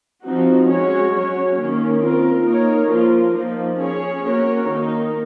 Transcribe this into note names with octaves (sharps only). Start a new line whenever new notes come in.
F3 C4 D#4 F#4
G#3 C#4 F#4 C#5
F#3 C#4 F#4 C#5
D#3 A#3 C#4
C4 F4 A#4
A#3 D#4 A#4 C#5
F3 A#3 F4 A#4
F3 A#3 D#4
C#4 G#4 C#5
A#3 C#4 F#4 A#4 C#5
D#3 A#3 D#4